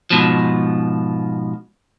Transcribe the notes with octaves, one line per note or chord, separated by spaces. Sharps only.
G#2 B2 F3